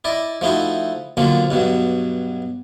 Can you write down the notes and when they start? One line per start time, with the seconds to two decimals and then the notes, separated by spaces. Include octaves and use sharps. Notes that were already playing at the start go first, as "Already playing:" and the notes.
0.04 E4 D5 D#5
0.41 F3 A3 D#4 E4 F#4
1.17 A#2 D3 F3 F#3 A#3
1.50 G2 B2 F#3